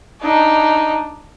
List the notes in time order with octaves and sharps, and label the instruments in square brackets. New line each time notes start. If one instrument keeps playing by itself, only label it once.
[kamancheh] D4 D#4